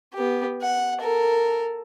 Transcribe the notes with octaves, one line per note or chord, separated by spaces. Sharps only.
B3 G4
F#5
A4 A#4